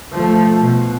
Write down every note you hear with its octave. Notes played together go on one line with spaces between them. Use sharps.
F3 A3
B2